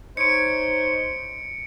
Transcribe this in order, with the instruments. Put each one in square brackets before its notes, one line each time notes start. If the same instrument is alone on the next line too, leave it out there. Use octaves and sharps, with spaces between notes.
[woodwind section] D#4 C5 C#5 [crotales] C#7 D7